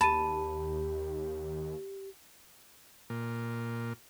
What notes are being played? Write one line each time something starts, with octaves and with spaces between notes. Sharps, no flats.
D#2 G4 A5 B5 D#7
A#2